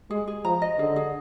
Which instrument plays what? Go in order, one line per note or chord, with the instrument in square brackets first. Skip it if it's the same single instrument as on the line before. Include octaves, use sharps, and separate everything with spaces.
[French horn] G#3 [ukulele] G#4
[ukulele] G#4
[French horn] F3 [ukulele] A#5
[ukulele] D#5
[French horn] D3 [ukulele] G#4
[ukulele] G#4